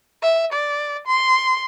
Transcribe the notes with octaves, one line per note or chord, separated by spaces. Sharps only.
E5
D5
C6